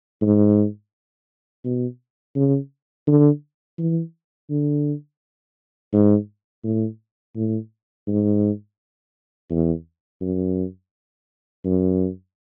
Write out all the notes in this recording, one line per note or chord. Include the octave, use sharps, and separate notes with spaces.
G#2
B2
C#3
D3
E3
D3
G#2
A2
A2
G#2
E2
F#2
F#2